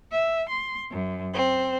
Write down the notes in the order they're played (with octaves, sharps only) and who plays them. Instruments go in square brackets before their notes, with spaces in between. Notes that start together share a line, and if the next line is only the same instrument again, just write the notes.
[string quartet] E5
C6
F#2
C4